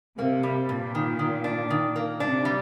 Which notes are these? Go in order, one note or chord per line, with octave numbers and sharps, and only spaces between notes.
C3 A#3
G3
G2 A#2
D#3
D#3
D4
D#3
A#3
C3 D4
G3